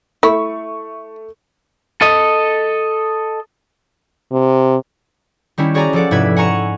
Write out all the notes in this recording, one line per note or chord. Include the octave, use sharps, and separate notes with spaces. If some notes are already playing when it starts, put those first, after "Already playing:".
A3 E4 C#6
A4 D#5
C3
D#3 G3 C#4 E4
F#4 G#4 C#5 D5 G#5 A#5
F3 A4 D5 F#5
F1 G#2 C3 E4 B4 G#6
F#5 G#5 A#5 C#6 C#7 E7